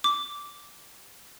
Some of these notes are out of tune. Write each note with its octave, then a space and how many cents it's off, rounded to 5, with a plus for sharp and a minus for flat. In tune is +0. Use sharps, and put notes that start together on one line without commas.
D6 -10